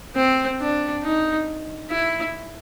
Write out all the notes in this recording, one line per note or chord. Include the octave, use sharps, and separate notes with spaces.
C4
D4
D#4
E4